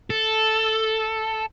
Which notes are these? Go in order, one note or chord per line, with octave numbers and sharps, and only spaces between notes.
A4